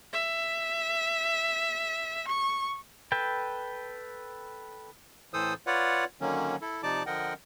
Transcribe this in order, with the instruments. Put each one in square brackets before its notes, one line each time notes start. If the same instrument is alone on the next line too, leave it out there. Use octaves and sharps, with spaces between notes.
[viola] E5
C#6
[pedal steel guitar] A4 B4 G5
[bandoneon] A2 E3 A4 C5 D#6 E6
F4 B4 C#5 D5 F#5
D3 D#3 F#3 A#3 C#4
E4 A4
C3 F3 D#4 D5 A5 D6
D3 F3 A#4 D#5 F#5 G5